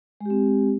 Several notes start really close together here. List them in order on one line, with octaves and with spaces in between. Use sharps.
G#3 G4 C4